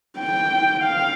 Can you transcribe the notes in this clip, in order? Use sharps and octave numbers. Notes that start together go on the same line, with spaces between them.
G5
F5